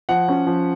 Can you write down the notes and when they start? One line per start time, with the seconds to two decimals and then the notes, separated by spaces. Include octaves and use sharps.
0.09 F3 F#5
0.28 C#4
0.47 F3